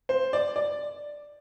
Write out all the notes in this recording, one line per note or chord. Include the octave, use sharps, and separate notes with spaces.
C5
D5
D5